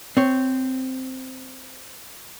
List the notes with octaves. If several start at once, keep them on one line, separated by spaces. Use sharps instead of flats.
C4 C#5